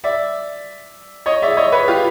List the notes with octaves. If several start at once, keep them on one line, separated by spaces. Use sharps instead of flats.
D5 E5
C#5 D#5
D5 E5
C#5 D#5
B4 C#5
F4 G4